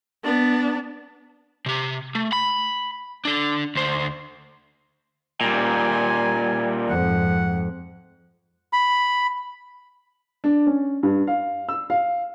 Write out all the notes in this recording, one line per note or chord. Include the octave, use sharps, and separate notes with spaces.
B3 D4
C3 G4
A3
B5
D4 A4
D2 C5
A#2 G3 G#5
F2 G#2 F#5
B5
D4
C#4
G2
F5
E6
F5